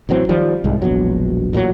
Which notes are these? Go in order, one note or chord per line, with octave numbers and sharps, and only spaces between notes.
A1 E3 F#3 C4
D#3 F3 G3
C2 G#2 G#3
E1 A#1 B2 F#3
A1 A#2 C#3 F#3